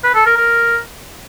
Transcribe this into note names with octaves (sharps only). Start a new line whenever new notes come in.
B4
A4
A#4
A#4